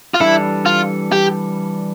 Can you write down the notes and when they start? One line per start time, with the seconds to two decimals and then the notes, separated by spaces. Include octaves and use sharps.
0.14 F4
0.20 E3 G3 D4 E4 A4
0.66 F4
1.12 G4